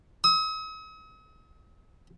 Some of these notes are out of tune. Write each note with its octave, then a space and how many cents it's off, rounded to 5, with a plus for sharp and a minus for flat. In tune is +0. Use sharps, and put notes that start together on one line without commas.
D#6 +45